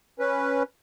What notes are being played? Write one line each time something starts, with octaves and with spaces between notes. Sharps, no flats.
C#4 B4